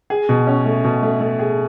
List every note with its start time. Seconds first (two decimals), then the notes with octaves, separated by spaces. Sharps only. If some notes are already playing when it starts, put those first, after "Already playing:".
0.10 G#4
0.29 B2
0.47 C#4
0.66 A3
0.84 B2
1.03 A3
1.20 A3
1.39 G#4